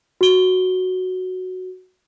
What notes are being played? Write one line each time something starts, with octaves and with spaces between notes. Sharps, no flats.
F#4 G7